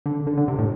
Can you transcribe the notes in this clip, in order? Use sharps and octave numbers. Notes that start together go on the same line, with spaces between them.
D3
D3
D3
C3
A2